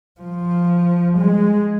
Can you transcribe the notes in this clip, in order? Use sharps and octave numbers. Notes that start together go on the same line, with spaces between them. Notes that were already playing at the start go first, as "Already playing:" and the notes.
F3
G#3